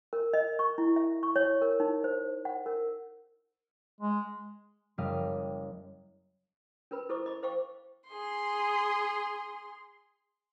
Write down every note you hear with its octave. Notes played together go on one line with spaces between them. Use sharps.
A#4
D#5
C#6
E4
E5
C#6
C#5
A#4
D#4
C5
F#5
A#4
G#3
F#1 G3 D#5 F5
C#4 A#4 B4 B5
E4 A4 C5 D#5 C#6 D6
D#5 B5 D6
C5 D#5 F5 G5 C#6 D6
G#4 C6